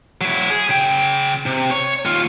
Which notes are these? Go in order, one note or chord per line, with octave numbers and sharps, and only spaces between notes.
F#3 E4
G#4
C#3 G5
C3
C#5
D#2 F4